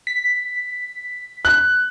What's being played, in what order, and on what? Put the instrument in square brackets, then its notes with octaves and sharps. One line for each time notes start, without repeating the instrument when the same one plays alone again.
[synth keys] B6
[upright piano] F#6